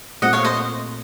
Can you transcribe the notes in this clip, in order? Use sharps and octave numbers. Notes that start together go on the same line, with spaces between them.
A#2 A3 C4 D#5 F#5
C#5 F5
C5 D#5